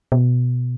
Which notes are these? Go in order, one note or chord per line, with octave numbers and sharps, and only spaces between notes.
B2